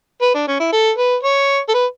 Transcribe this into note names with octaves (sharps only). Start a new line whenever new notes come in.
B4
D4
C#4
E4
A4
B4
C#5
A4
B4